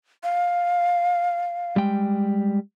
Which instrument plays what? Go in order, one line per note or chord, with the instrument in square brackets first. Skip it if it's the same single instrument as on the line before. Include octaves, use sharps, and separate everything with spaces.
[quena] F5
[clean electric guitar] G3 G#3 G5